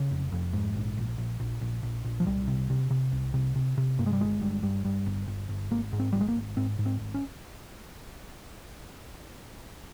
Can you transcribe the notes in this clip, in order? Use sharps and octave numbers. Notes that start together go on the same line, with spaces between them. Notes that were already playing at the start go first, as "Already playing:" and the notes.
Already playing: C#3
F1
F2
G#2
A#1
A#1
A#1
A#1
A#1
A#1
A#1
F3
C2 G3
C3
C3
C3
C2
C3
C3
C3
G2 A#3
G#3
G3
G1 G#3
G2
G2
G2
G1
G1
G1
G#1 A#3
G#2
C4
G#1 G3
G#3
A#3
G#1
G#2 C4
G#2
C4
G#1
C#4